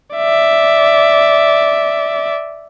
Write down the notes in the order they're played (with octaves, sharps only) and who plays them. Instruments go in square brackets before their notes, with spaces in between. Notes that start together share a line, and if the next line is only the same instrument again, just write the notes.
[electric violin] D5 E5